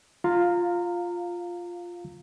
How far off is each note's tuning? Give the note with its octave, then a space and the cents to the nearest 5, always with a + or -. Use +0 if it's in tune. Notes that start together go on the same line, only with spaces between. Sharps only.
F4 +0 F5 +10 A#5 -20